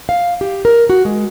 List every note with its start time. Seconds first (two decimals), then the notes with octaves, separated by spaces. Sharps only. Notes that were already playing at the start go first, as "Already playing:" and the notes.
0.09 F5
0.41 G4
0.65 A#4
0.90 F#4
1.05 G#3